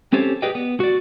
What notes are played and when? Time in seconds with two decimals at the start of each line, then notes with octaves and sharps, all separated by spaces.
0.13 C4 C#4 G4 A4 C5 C#5
0.42 G4 G#4 B4 D5 D#5 G5
0.55 B3
0.80 F#4 D5